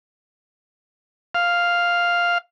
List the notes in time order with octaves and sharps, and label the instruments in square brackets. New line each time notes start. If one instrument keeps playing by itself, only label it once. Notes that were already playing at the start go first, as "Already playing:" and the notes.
[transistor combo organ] F5